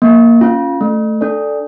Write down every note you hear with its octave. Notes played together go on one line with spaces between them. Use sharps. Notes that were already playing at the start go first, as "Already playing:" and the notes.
A#3
C#4 F4
A3
D4 A4 D5